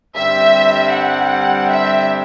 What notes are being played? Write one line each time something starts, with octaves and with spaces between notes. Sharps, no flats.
G2 D3 G3 C4 E5
F#5
E5